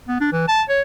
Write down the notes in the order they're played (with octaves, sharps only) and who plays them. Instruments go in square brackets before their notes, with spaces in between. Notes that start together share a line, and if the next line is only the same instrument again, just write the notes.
[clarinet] B3
D4
E3
A5
C#5